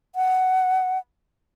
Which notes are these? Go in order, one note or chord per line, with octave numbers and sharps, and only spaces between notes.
F#5